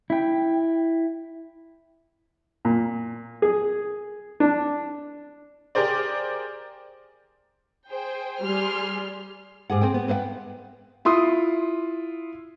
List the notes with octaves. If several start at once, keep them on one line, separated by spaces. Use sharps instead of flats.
E4 G5
A#2
G#4
D4
G4 G#4 A#4 C5 D5
G#4 C5 G5
G3 G#4 C6 F6
G#2 G4 G#4 F#5
C4 G#4 C5 G5
B3
B4 C5 E5 F#5 G5
E4 F4 C6 D#6